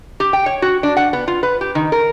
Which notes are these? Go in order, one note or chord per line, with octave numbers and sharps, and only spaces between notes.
G4
G5
C#5
F#4
D4
F#5
B3
F4
B4
G4
D#3
A#4